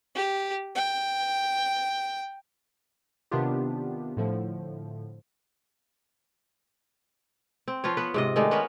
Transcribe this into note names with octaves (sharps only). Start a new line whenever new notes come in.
G4
G5
C3 D#3 B3 D4 F4 G4
A2 D3 F3 A3
C4
F3 F4 B4 C#5
B3 B4
G#2 C3 D#5
D#3 G#3 A3 D4
B3 C#4 A#4 B4